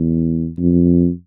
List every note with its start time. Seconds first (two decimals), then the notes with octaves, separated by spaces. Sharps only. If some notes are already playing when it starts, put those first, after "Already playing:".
Already playing: E2
0.58 F2